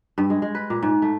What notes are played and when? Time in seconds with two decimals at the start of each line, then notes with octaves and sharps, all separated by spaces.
0.18 G2
0.30 G#3
0.42 G#3
0.55 B4
0.70 A#2
0.82 G#2
1.02 A3